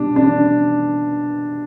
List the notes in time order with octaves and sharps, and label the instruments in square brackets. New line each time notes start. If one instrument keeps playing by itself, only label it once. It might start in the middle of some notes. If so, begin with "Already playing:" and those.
Already playing: [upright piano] B2 G3 D4
D4